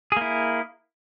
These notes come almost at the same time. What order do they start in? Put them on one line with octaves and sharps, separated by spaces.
G#4 A#3 E4